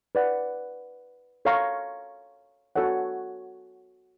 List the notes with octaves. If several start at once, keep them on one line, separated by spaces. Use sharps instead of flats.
B4 D5 F#5
A4 C#5 F5 A#5 C#6
F#4 A4 C#5 F#5